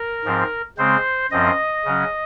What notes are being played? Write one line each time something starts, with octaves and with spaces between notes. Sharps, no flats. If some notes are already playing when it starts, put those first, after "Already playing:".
Already playing: A#4
G#2 F3 C4
C#3 G#3 C4 C5
F#2 F3 C4 D#5
C#3 F#3 C#4